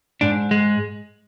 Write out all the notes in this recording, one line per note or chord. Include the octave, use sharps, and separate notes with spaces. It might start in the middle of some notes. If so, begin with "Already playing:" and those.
G#2 D4
G#3